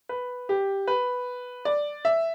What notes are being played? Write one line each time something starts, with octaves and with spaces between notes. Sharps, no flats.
B4
G4
B4
D5
E5